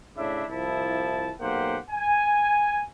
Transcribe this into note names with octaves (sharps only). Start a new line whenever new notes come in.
A2 C#3 D4 E4 E5
C2 F3 E4 A5
B1 A#3 G4 C5 F#5
G#5